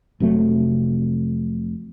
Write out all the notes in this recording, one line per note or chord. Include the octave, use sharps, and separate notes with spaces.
F1 C3 F#3 A3